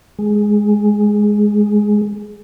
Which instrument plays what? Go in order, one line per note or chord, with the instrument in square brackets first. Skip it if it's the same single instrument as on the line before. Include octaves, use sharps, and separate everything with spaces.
[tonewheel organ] G#3